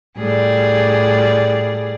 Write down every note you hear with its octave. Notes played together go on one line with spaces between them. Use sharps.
A2 G3 G#4 D5